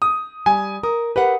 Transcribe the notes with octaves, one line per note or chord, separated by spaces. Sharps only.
D#6
G3 G#5
A#4 D#6
G4 A#4 B4 F#5